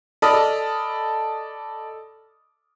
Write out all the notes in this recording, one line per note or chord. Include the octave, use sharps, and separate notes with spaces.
A4 D5 D#5 B5 D#6 F6